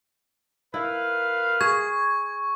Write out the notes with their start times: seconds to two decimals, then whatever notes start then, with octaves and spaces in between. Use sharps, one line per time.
0.74 E4 A#4 B4 F5
1.61 G#4 C#6 G#6